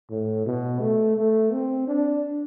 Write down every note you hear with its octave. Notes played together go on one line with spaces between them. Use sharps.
A2
B2
A3
A3
C4
D4